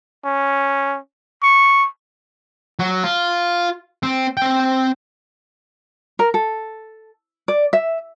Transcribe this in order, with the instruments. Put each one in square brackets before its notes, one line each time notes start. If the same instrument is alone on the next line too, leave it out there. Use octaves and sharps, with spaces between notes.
[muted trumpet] C#4
C#6
[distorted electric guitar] F#3
F4
C4
C4 G5
[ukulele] A#4
A4
D5
E5